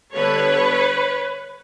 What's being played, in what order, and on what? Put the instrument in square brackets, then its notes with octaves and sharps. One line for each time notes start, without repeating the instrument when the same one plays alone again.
[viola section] D3 G3 B3 D4 B4 C#5